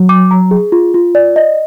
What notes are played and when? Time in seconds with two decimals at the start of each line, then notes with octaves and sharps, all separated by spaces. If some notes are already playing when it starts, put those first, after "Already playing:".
Already playing: F#3
0.09 D6
0.31 A#5
0.51 G#4
0.72 F4
0.94 F4
1.15 D5
1.36 D#5